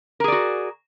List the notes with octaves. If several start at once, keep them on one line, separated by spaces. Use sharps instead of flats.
F#4 G#4 A#4 D5